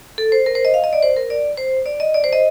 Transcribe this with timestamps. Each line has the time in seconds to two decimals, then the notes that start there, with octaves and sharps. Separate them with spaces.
0.18 A4
0.32 C5
0.46 A#4
0.55 C5
0.65 D#5
0.74 F5
0.84 D#5
0.93 D5
1.03 C5
1.17 A#4
1.30 D5
1.58 C5
1.86 D5
2.00 D#5
2.14 D5
2.24 C5
2.33 D#5